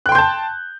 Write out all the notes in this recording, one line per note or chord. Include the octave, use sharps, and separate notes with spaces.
G5 A5 C6 F#6 G6